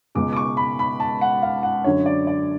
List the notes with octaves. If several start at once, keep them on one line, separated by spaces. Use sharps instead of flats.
C#2 B2 G#3 D6
D6
C#6
B5
B5
A5
F#5
F5
F#5
F#2 D3 F#3 C#5
D5
D5